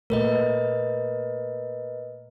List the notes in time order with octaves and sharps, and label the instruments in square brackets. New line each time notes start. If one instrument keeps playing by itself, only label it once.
[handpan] A#2 A3 [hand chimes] A#4 B4 D#5